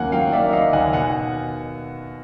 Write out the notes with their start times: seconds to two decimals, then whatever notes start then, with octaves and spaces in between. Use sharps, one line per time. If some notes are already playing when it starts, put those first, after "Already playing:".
Already playing: D#2 C#3 F#3 A#3 F#5 G#5
0.12 F#3 F5 G5
0.32 A#3 D5 E5
0.53 F#3 D#5 F5
0.73 D#2 F#5 G#5
0.93 B2 F#5 G#5